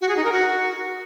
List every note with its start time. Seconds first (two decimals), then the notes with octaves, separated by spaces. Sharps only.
0.01 F#4
0.09 G#4
0.17 D#4
0.24 A#4
0.32 F#4